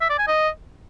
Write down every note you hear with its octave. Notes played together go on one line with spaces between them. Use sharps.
E5
D5
G#5
D#5